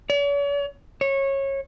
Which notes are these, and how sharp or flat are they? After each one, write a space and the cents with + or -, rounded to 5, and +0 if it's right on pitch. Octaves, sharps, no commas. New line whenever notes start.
C#5 +45
C#5 -20